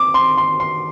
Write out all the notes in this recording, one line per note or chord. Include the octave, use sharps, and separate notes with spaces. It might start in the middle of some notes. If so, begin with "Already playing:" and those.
Already playing: D6
C6
C6
C6